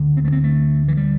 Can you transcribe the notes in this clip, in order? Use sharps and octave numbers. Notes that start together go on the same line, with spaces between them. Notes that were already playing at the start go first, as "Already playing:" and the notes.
Already playing: D2 D3
C4
A3
C4
A3
E3
G3